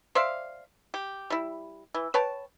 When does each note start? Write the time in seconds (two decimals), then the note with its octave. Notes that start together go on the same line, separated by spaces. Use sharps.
0.15 C5 D5 E5 F5
0.94 G4
1.30 G3 E4
1.94 E3
2.14 B4 C#5 G5 A5